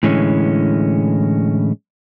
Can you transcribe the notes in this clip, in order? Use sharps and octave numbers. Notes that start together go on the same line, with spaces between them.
A2 D3 E3 G#3 A3 C#4